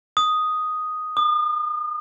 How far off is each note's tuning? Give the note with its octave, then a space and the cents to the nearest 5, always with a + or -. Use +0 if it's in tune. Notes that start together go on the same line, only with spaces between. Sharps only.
D#6 +0
D#6 -40